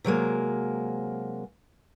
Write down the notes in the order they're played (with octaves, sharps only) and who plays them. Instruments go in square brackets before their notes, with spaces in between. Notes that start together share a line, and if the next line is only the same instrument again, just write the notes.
[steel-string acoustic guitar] C3 F#3 G#3 A#3